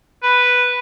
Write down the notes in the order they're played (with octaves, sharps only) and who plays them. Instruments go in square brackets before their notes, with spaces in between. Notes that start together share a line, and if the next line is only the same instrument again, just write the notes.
[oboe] B4